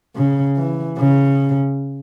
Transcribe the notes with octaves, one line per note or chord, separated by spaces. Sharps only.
C#3
E3
C#3